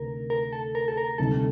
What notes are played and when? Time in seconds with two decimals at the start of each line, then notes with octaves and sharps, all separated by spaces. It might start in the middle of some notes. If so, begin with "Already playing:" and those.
Already playing: D2 C3 D#3 A3 D#4 A#4
0.30 A#4
0.53 A4
0.75 A#4
0.88 A4
0.97 A#4
1.18 D2 C3 D#3 G3 A4